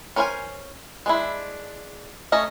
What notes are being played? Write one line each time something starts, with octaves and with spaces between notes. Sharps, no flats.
C#4 A#4 C5 F5 G#5
G#3 D4 E4
A3 C#4 D#5 A5 A#5